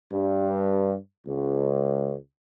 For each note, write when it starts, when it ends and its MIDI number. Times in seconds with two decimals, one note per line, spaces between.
0.12 0.95 43
1.27 2.15 37